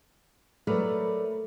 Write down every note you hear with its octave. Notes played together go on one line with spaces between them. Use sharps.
F#3 A3 A#4 B4 D5